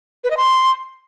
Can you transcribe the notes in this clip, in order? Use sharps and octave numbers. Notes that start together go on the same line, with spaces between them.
B4
D#5
C6